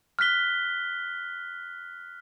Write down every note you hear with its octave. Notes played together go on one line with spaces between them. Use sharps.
F6 F#6 B6 G7